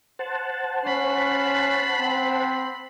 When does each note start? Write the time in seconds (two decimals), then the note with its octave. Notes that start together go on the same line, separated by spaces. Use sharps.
0.19 C5 F#5 A5
0.86 C#4 B5 C7
2.00 C4